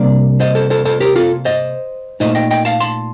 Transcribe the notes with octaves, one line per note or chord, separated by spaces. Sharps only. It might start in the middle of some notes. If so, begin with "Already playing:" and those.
Already playing: C3 G3 A#3 D4 D5
C5 D#5
A4 C5
A4 C5
A4 C5
G4 A#4
F4 A4
C5 D#5
A#2 A3 D#4 C5 D#5
D#5 G5
D#5 G5
F5 A5
A5 C6